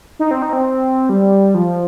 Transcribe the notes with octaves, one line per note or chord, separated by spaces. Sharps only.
D#4
C4
D#4
C4
G3
F3